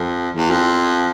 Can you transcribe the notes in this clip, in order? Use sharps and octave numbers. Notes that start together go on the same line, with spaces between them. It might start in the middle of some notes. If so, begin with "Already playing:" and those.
Already playing: F2
E2
F2